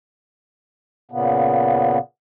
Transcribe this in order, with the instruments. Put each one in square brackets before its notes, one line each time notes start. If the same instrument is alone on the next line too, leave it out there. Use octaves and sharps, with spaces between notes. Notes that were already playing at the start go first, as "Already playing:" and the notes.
[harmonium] A#2 C#3 B3